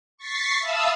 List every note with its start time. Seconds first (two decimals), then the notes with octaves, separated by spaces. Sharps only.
0.17 C#6 A6 B6 C7
0.59 E5 F5 A5 B5 D#6 E6